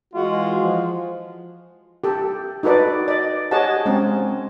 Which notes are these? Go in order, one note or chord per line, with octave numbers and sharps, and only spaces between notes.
E3 G#3 F4 F#4
F3
G4 A4
D#4 F#4 A4 B4 D5
D5 D#5
G4 G#4 C#5 D#5 F#5 A5
G#3 C4 C#4